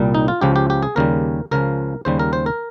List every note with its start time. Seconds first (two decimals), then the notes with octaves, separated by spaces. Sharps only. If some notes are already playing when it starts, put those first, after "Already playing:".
Already playing: C2 A#2 G3
0.15 D#4
0.28 F4
0.41 C#2 C#3 F3 G4
0.56 G4
0.70 G4
0.83 G#4
0.96 D#2 C#3 G3 A#4
1.51 C#2 C#3 F3 A#4
2.05 D#2 C#3 G3 C5
2.19 A#4
2.33 C5
2.46 A#4